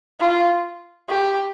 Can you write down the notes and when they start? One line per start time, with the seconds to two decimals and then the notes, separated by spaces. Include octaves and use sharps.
0.20 F4
1.09 G4